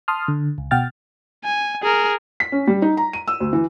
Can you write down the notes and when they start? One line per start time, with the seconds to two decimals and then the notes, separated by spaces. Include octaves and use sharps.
0.08 A5 C6 D#6 F6
0.28 D3
0.58 C#2
0.71 B2 F#5 G5 F6 A6
1.44 G#5
1.82 G#4 A#4
2.40 B6
2.52 C#4
2.67 G3
2.82 D#4
2.97 A#5
3.13 D#7
3.28 E6
3.40 D2
3.53 E3